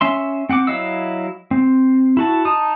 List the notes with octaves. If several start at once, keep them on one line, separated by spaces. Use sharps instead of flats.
C#4 E5 C6
C4 F#5 G5 D6
F#3 E4 D#5 F5 E6
C4
E4 F#4 A5
D#4 A5 D#6